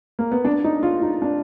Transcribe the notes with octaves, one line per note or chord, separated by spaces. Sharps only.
A#3
B3
D4
D#4
F4
D#4
D4